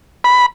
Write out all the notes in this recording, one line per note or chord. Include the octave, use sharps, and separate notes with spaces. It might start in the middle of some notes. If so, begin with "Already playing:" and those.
B5